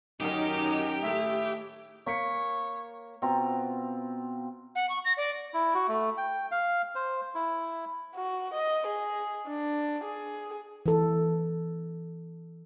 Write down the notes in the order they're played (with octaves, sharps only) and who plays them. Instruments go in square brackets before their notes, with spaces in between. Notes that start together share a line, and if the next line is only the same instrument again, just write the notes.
[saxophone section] F#2 F#3 D#4 [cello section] D#3 C#4 A#4 [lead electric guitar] G4
[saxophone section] A2 G#4 E5 [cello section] A3
[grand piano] A#3 B6 C#7 [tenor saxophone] C#5
[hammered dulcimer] B2 C4 F4 A#5
[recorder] F#5
C#6
A#6
D5
[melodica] E4
F#4
A3
G5
F5
C5
E4
[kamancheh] F#4
D#5
G#4
D4
G#4
[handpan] E3 A4